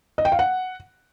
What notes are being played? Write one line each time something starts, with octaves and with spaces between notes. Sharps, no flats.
D#5
G5
F5
F#5